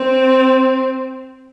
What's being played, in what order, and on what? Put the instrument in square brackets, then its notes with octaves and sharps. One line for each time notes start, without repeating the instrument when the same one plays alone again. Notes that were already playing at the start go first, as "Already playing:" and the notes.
Already playing: [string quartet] C4